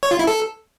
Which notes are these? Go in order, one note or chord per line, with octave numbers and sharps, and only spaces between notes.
C#5
F4
E4
A4